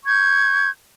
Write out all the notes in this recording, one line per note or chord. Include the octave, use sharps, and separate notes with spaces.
C#6 G6 G#6